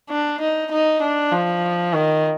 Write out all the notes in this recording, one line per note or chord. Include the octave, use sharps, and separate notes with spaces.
D4
D#4
D#4
D4
F3
D#3